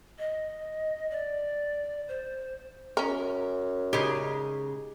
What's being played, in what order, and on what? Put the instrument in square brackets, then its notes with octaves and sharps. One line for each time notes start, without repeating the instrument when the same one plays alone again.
[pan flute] D#5
D5
C5
[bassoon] F#2 [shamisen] C#4 A#4
[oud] C#3 G#3 D#4 [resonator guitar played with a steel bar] G4 G#4